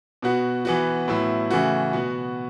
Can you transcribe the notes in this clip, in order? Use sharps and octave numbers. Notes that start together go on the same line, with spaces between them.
B2 B3 F#4
E3 B3 F#4
A2 F#3 B3 E4
C#3 E3 A3 F#4
B2 B3 F#4